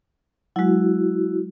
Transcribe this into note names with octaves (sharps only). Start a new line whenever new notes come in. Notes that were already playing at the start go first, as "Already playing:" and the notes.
F#3 G#3 E4 F#4